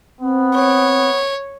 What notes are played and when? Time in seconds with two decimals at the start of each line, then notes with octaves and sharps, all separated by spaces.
0.20 B3 C4
0.55 C#5